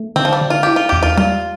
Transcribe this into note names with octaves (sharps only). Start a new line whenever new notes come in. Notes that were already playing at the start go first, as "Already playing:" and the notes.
Already playing: A3
D3 C4
F3
G3
D3
F4
E4 G4
F4
E2 G4
F4
G3 F4